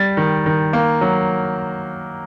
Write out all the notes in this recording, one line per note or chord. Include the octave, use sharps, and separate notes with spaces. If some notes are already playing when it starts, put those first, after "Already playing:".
Already playing: G3 A6
D#3
D#3
A#3
F#3